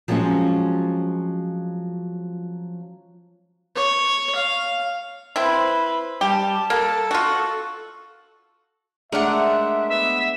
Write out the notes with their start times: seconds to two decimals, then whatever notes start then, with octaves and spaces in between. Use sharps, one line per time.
0.08 F3 F#3 G#3 C4 C#4 F4
3.75 C#5
4.35 F5
5.36 C4 E4 B4 C5
6.21 G3 G4 A5
6.70 A#3 A4
7.11 F4 F#4
9.12 G#3 A3 D4 A#4 E5 F#5
9.89 B3 E5